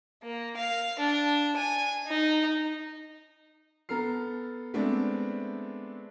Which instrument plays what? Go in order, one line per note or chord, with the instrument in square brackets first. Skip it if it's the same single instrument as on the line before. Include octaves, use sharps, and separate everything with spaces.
[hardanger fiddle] A#3
F5
D4
G#5
D#4
[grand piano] B3 A4 A#5 F6 C7
G#3 A3 B3 C4 D4